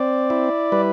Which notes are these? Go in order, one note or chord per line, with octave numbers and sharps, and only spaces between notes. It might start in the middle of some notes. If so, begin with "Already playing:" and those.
Already playing: C4 D5
E4
G3 B4